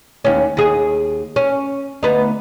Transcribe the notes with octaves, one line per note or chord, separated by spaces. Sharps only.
D#2 C#4
D#2 G#4
C#4
D2 B3 D#4